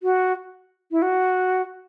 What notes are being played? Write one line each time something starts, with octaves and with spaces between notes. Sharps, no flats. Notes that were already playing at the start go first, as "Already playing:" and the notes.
F#4
E4
F#4